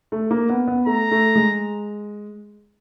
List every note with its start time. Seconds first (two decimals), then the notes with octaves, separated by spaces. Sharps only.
0.12 A3
0.31 A#3
0.49 B3
0.67 B3
0.86 A3 A#5
1.11 A3
1.35 G#3